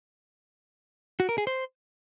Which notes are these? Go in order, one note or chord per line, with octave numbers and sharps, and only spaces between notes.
F#4
A#4
G#4
C5